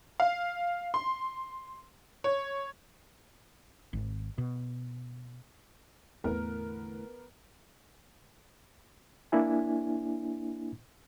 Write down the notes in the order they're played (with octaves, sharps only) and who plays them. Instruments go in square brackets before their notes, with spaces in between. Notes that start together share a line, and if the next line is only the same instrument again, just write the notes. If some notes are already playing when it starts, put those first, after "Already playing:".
[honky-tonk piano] F5
C6
C#5
[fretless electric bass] G#1
B2
[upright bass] E2 D3 [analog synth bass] A2 [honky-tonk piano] B3 A#4
[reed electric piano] A#3 D4 E4 G#5